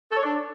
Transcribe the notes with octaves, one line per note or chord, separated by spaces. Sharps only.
A4
C#5
D4